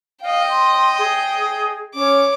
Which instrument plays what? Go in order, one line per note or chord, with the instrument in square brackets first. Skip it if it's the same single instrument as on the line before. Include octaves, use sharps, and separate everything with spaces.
[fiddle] D#5 G5 [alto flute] F5
[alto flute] C6
G#4
[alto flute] C#4 [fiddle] C#5 D6